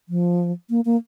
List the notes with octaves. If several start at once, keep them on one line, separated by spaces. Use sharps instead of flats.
F3
A#3
A#3